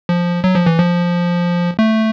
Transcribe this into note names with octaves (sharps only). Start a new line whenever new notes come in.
F3
F#3
F3
E3
F3
A3